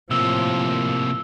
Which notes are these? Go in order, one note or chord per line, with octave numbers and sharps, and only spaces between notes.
A2 C3 F3 A#3 E6